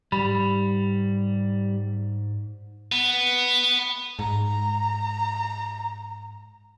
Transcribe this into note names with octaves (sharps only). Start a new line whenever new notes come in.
G#2 G3 B5
B3
G#2 A#5